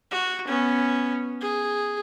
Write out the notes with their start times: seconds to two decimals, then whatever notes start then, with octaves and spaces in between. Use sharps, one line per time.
0.11 F#4
0.47 B3 C#4
1.41 G#4